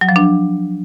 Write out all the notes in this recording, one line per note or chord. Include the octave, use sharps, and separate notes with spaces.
F#3
F3
D4